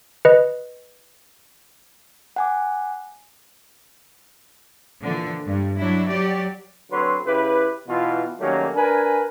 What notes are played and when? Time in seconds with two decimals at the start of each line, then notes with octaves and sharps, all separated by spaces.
0.25 B4 D#5
2.36 F#5 G#5 D6
5.01 A#2 D3 E3 F3
5.45 G2 G3
5.79 F#3 D4 E4
6.09 F#3 G4 D5
6.91 D3 F#3 C4 B4 C#5 C6
7.26 C#3 E4 G4 B4
7.88 B2 E3 F4
8.40 D#3 F#3 G3 A3 A#3 C#4
8.75 D4 A#4 B4 G#5